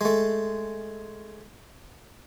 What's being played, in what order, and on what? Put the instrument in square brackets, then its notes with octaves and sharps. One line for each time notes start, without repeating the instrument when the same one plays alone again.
[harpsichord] G#3 A3